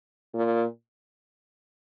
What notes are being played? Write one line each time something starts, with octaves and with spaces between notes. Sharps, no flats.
A#2